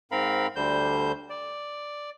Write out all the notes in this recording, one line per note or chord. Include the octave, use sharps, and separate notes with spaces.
G#2 C4 A#4 F5 B5
D2 D3 G3 C5 G6
D5